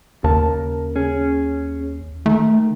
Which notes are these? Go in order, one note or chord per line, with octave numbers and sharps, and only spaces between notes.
D#2 C#3 A#4 A5
C#4 G#4
D#3 A3